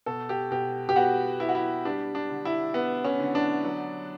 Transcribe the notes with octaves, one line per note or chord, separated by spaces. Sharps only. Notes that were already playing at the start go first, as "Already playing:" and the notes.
B2 A4
G4
B2 G4
G4
B3 F#4
B3 E4
F#4
E4
G3 D4
D4
D3
E4
B3
C#4
D3
D4
F#3